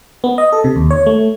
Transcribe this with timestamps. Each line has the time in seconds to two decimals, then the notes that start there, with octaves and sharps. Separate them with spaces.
0.24 B3
0.38 D#5
0.52 A4
0.64 C3
0.76 D#2
0.90 C#5
1.06 A3